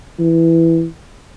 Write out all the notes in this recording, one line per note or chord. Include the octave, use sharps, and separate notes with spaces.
E3